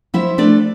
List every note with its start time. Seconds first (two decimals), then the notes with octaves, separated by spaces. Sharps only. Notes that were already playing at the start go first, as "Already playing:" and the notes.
0.14 F3 E4 E5
0.38 A3 D4 D5